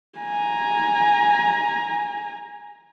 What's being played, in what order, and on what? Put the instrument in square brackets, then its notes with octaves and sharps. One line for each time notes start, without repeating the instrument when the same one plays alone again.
[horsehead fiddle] G#5 A#5